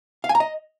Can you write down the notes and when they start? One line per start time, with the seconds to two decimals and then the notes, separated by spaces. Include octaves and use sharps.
0.24 F5
0.29 G#5
0.35 A#5
0.40 D#5